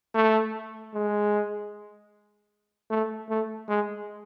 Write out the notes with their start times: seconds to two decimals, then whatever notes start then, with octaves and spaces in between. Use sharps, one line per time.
0.15 A3
0.94 G#3
2.90 A3
3.30 A3
3.68 G#3